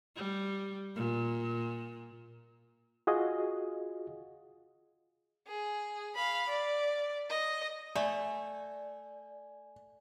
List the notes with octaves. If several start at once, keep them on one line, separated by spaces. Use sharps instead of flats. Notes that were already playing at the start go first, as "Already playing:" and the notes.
G3
A#2
F4 F#4 G#4 D#5
G#4
F5 B5
D5
D#5
A3 D5 G#5